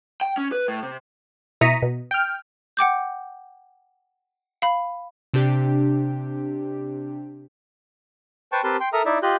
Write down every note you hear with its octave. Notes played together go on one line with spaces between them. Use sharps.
G5
C#4
B4
A2
C3
B2 E4 A#5 C#6 D#6 B6
B2
G5 F6
F#5 G5 D6 G6
F5 B5
C3 D4 G4
B4 C5 G5 A5 C#6
C4 G4 A#4 B4 A5 C6
G5 C6
A4 A#4 E5 A#5 D#6
D#4 E4 D5 E5
F4 G4 D#5 F#6 G6